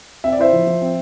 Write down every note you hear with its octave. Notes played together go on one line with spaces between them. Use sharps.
C4 E5
D5
E4 C5 E5
F3
F3
C4